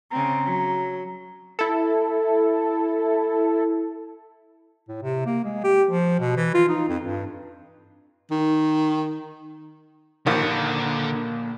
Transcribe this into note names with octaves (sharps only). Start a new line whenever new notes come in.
C#3 C4 A#5
F#3
E4 A4
A2
C3
A#3
G#3
G4
F3
B2
E3
F4
D#4
F2
G2
D#3
A#1 D#2 D3 F#5
A#2